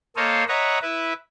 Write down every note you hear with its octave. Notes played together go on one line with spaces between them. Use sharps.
A#3 A4 C5 C#5 D#5 F5
B4 C#5 D#5 E5 F#5 A#5
E4 B4 E5